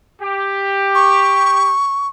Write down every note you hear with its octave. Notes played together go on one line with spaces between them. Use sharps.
G4
C#6